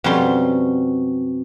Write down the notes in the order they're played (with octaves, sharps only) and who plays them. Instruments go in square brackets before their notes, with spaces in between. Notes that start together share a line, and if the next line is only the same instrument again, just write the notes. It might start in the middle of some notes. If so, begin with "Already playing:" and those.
[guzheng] F2 B2 F#3 G3 C#4 C6